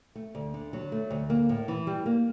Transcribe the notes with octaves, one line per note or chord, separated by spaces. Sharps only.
A3
D2
D3
F#3
A3
D2
A#3
A2
E3
G3
A#3